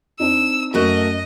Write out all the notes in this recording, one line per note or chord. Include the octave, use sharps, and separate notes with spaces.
C4 D4 D#4 E6
F#2 A3 F#4 A#4 D#5 C#6 F#6